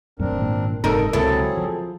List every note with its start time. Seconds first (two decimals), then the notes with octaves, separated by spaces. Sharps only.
0.19 D#1 F#2 A3 C4 D4 A#4
0.38 G#1 A#2
0.84 F#1 G#2 C3 D#4 A4 A#4
1.13 C#2 C3 F#3 C4 E4 G#4 A4
1.57 F3